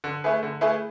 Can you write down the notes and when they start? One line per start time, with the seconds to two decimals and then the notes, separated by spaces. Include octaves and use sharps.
0.04 D3
0.24 A3 E4 G#4 B4
0.43 D3
0.61 A3 E4 G#4 B4